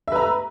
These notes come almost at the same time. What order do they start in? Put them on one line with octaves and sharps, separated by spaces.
E5 B4 A#5